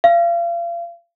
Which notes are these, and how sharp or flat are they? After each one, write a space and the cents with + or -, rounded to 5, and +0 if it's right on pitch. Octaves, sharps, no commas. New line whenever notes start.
F5 -35